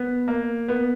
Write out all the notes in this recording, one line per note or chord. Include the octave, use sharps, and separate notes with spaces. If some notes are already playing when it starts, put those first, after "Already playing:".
Already playing: B3
A#3
B3